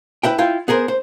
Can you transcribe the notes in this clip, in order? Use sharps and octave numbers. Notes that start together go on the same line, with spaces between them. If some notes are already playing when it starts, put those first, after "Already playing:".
E4 B4 E5 G5
E4 F4 G5
B3 G#4 A#4 C5
C5